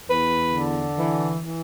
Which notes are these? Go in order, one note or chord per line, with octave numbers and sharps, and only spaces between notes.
E2 B4
D3
E3
E3